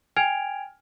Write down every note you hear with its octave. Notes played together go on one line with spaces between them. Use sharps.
G5 G#5 F6 G#6 D7 F7